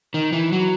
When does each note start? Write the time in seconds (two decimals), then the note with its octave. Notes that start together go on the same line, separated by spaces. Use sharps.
0.14 D#3
0.33 E3
0.52 F#3